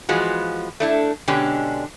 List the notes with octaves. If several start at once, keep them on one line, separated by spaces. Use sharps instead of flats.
E3 F3 G#3 B3 F4 F#4
A3 D4 E4
B2 D3 G#3 C#4 D4 G4